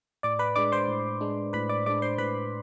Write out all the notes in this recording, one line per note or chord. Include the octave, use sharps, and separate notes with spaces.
A2 D5 D6
B4 B5
G#3 D4 D5 D6
C5 C6
A2
G#3 D4
A2 B4 B5
D5 D6
G#3 D4 D5 D6
C5 C6
A2 B4 B5